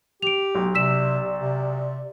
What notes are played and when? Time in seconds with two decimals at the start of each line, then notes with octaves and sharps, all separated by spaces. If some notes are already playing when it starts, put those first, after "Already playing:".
0.22 G4 D7 F7
0.55 B1
0.75 C3 D5 E6 B6 E7
1.38 C3